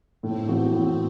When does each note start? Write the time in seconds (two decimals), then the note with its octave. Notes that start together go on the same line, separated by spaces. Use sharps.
0.23 A2 C4
0.47 E3 B3 F#4
0.73 A2